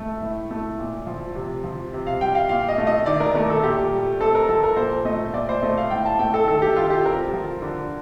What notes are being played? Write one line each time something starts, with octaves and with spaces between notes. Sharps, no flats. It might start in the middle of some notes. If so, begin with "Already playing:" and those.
Already playing: A3
A2
A3
A#2
F3
C3
F3
C3
F5
G3 G5
F5
A#2 F5
D#5
A3
D#5
D#3 D5
A#4
A3 A#4
A4
A#2 G4
G3
C4 A4
A#4
F3 A4
A#4
A#2 C5
A3 D#5
A#2 D5
C5
A3 D#5
F5
A2 G5
A5
A3 G5
A4
D#3 A4
G4
G3 F4
G4
C4 A#4
F3
D3